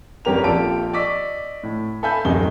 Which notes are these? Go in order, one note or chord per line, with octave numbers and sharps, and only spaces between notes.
G#1 G2 C#4 G4 A#4 F7
A#1 F4 G4 A4 A5 D7
D5 D#5 C#6 D6 E6 B6
A2
A4 E5 F5 G#5 B5 G6
D1 F#2 C3 D#4 G7